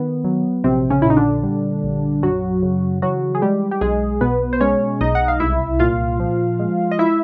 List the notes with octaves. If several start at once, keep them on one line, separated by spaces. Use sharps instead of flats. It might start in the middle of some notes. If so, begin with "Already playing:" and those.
Already playing: D#3 B3
F#3
A#1 C3 C4
C#3 C#4
A#2 E4
D#4
D3 D4
G3
A#1
F#2 F#3 F#4
C#3
E3 F#3 F#4
G#4
G3 G#3 G4
G4
B1 G#3 G#4
B2 B3 B4
C5
G#3 C#4 C#5
B1 D#4 D#5
F#5
F5
C2 E4 E5
A#2 F4 F5
F3
G#3
D#5
E4 E5